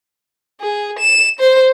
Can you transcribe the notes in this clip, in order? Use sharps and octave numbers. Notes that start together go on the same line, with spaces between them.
G#4
E7
C5